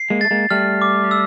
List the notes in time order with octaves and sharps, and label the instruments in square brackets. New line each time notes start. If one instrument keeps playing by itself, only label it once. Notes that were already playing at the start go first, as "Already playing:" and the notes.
Already playing: [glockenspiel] C7
[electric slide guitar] G#3 A#3
[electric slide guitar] A3 [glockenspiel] A6
[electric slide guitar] G#3 A#3
[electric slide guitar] G3 A3 [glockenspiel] F6
[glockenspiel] D6
E6